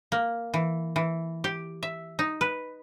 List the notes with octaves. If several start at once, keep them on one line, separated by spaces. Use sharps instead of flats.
A#3
E3
E3
G4
E5
D#4
B4